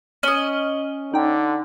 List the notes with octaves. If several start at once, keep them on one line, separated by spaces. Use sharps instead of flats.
C#4 D#5 F6 F#7 G7
D3 D#4 G5